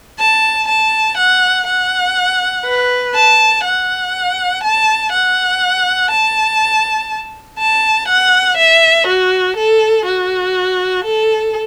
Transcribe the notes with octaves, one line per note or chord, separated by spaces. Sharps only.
A5
A5
F#5
F#5
B4
A5
F#5
A5
F#5
A5
A5
F#5
E5
F#4
A4
F#4
A4